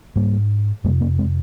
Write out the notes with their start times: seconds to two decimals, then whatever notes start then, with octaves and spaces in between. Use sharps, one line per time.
0.16 G#2 G3 A#3
0.84 F2 C3 G3 A#3
1.01 A#3 C#4
1.18 G#3 C4